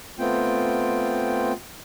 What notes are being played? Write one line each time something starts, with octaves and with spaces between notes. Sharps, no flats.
A3 B3 C4 F4 G5